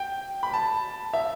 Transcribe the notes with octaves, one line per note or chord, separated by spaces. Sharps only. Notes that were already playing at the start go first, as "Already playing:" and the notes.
Already playing: G5
B5
A5
E5